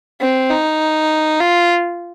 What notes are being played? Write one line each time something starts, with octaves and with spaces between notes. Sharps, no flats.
C4
D#4
F4